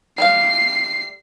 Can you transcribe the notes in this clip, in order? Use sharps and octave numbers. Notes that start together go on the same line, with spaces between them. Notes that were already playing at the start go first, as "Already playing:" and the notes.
G3 A3 F5 C7